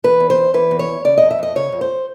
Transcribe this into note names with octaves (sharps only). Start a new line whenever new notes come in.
E3 B4
E2
C5
E2
E3 B4
E2
C#5
E2
C#3 D5
F2 D#5
E5
F2 D#5
C#3 C#5
F2
C5